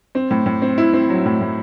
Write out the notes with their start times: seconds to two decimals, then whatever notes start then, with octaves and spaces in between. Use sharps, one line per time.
0.15 C4
0.31 A2
0.46 A2
0.62 C4
0.78 E4
0.93 C4
1.10 F#3
1.26 A2
1.41 A2